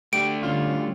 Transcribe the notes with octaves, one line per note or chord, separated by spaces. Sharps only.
A3 D4 G4 D7
D3 G3 C#4 F4